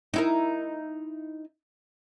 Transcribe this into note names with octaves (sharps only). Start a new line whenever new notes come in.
D#4 E4 A#4